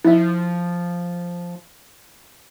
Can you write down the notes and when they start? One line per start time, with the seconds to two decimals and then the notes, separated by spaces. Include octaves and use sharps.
0.05 F3 E4 E5